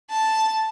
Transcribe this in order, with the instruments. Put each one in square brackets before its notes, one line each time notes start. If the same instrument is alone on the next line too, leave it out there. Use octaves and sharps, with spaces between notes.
[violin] A5